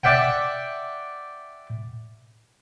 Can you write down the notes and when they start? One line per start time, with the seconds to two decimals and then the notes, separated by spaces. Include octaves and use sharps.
0.03 D5 E5 F#5 G5